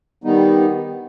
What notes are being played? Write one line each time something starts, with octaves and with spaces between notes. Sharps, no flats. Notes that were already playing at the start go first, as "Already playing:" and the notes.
D#3 G3 B3 D#4